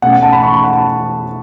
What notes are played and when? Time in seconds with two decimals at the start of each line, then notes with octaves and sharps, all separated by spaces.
0.02 B2 A3 C#4 F#5
0.13 F#5
0.23 A5
0.32 B5
0.43 C#6
0.54 B5
0.64 F#5
0.73 A5